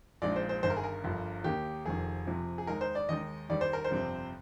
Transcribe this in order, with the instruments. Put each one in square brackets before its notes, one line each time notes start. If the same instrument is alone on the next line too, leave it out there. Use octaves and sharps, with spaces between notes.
[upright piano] A#1 A#2 G#3 D#4 D5
C5
C5
G1 G2 D#3 C5
A#4
G#4
A#4
G1 G2 D3 F3
D#2 D#3 A#3 D#4 G4
F1 F2 D#3 G#4
F2 C3 F3
G#4
D#2 D#3 G#3 D#4 A#4
C5
D5
D#2 D#3 G#3 D#4 D#5
D#2 D#3 G3 D5
C5
A#4
C5
G1 F2 C3 G3 C4